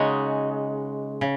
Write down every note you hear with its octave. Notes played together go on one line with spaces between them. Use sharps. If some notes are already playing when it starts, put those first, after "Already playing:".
Already playing: C#3 G#3 D#4 F#4 C#5
C#3